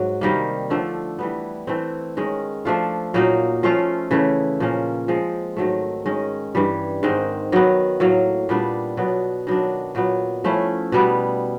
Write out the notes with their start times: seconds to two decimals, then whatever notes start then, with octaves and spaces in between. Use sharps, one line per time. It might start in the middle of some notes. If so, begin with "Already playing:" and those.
Already playing: G#2 F#3
0.21 C3 D#3 G3 A#3
0.70 D3 F3 A3 D4
1.19 E3 G3 B3
1.67 E3 A3 C4
2.17 D#3 G#3 C#4
2.65 F3 A3 D4 F4
3.14 A#2 F#3 A#3 D#4
3.63 F3 A3 C#4 F4
4.11 C#3 E3 A3
4.60 A#2 F3 A#3 C#4
5.08 F3 G#3 C4
5.57 G#2 D#3 F#3 A3
6.06 D#3 G#3 C#4
6.55 G2 E3 G3
7.03 G#2 D#3 G#3 C4
7.52 D#3 F#3 B3
8.00 A2 F#3 A#3
8.49 A#2 G3 B3 D4
8.97 B2 F#3 B3
9.47 D#3 F#3 B3 D4
9.95 A#2 F#3 B3
10.44 F3 A3 C#4 E4
10.92 B2 G3 B3